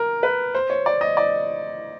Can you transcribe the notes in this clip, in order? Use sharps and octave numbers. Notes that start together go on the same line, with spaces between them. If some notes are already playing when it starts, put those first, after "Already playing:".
Already playing: A#4
B4
C5
C#5
D5
D#5
D5